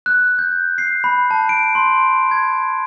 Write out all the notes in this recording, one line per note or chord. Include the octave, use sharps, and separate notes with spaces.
F#6
G6
C7
B5
A5
D7
C6
G#6